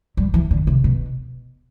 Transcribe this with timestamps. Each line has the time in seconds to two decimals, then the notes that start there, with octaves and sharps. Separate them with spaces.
0.17 G3
0.34 E3
0.51 D3
0.67 C3
0.84 B2